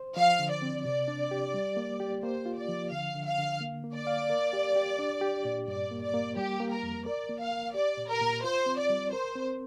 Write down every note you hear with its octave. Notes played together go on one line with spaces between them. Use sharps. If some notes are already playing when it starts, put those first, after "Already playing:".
Already playing: C5
F3 F5
D3
D5
C4
C3 D5
D4
G4
G3
A#3
G4
A#3 C5
F4
D5
F3
D3 F5
D3
F5
D3
A#3
A#3
D5
F5
A#4
G4
G4
D4
G4
A#2
G2 D5
A#3
D5
A#3
G3 G4
A#3
A#4
F2
A#4 D5
A#3
F5
A#4
G4 D5
A#2
A#4
A#2
F4 C5
C4
D5
G3
A#4 C5
C4